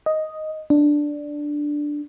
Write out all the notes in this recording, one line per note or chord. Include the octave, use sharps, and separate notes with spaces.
D#5
D4